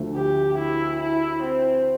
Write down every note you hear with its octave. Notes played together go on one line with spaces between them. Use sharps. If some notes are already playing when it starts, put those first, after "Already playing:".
Already playing: D2 D3 F3 A3
G4
E4
E4
C4